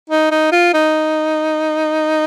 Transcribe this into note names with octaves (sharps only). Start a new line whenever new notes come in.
D#4
D#4
F4
D#4